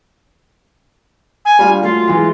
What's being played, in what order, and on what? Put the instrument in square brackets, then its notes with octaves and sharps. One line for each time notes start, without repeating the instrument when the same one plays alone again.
[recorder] G#5
[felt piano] G3 D4 F4
[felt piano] F#3 A3 [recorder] F4
[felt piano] E3 G#3